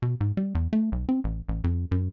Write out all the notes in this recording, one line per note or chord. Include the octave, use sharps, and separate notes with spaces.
B2
G#2
G3
E2
A3
B1
C4
A1
A1
F2
F#2